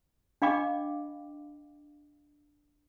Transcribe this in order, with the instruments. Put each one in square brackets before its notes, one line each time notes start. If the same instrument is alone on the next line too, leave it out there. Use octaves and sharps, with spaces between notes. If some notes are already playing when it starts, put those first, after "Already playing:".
[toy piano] D4 D#5 F5 G5 B5 D6